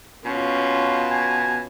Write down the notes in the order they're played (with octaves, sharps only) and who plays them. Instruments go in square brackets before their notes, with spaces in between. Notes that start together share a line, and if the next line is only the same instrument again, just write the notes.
[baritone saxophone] B2 [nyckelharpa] C#4 F4
[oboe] G#5